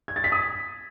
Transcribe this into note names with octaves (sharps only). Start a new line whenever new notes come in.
G#6
A6
B6
D#6